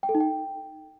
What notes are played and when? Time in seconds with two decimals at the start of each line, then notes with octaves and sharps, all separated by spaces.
0.03 G5
0.09 A4
0.15 D#4
0.20 G5